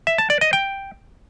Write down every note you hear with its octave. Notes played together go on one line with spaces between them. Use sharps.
E5
A5
D5
D#5
G5